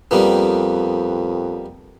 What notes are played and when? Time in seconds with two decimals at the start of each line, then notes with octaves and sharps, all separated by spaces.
0.11 F2 G3 A#3 B3